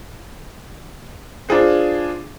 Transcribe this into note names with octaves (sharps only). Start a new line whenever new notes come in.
D4 F4 G#4 C5